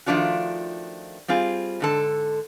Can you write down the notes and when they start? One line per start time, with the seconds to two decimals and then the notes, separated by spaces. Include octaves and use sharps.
0.06 D#3 F3 A3 D4 F4 F#4
1.28 G3 C4 F4 G#4
1.80 G#2 D3 A4